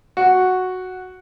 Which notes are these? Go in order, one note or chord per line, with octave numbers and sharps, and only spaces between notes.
F#4